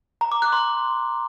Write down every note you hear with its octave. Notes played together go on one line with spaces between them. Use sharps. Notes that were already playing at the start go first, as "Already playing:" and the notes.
A#5
D6
F#6
C6